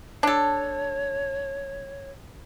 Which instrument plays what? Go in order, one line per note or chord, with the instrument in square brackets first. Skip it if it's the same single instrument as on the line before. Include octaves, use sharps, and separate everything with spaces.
[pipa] D4 A4 [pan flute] C#5